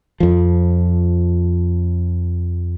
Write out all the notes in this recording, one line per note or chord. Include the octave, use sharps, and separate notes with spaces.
F2 F3